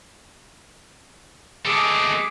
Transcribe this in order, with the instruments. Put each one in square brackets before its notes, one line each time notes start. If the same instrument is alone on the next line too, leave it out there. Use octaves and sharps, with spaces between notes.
[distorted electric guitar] G#3 A3 [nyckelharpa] G#4 D6